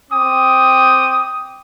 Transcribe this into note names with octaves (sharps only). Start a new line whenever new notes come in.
C4 G5 D6 D#6